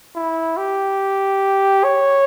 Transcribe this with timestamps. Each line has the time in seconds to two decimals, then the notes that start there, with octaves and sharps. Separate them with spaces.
0.15 E4
0.57 G4
1.84 C#5